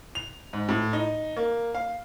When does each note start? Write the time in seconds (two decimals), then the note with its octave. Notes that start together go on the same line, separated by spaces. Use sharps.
0.15 F7
0.53 G#2
0.69 A2
0.93 D#4
1.37 A#3
1.75 F5